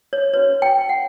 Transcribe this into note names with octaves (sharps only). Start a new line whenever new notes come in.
C#5
C#4 F#4 B4 C#5
G5
F#5